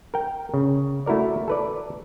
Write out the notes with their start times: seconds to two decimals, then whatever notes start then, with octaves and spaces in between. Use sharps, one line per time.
0.14 A#4 G5
0.54 C#3
1.06 A3 E4 F#4 A#4 D5
1.48 A4 B4 D5